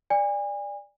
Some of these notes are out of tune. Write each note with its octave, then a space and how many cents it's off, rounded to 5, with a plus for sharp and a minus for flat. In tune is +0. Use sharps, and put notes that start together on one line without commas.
D5 +0 G#5 -35